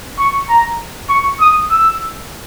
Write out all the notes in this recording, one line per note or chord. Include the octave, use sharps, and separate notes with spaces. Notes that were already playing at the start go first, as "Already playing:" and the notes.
C#6
A#5
C#6
D#6
E6